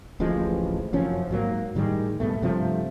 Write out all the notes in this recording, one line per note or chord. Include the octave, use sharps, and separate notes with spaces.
D1 A1 F3 G#3
F1 F#2 F3 C#4
G#2 F#3 A#3
A2 D#3 G3 G#3
G2 B2 A3
G2 C3 F3 A3